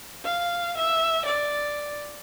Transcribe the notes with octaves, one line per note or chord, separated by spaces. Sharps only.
F5
E5
D5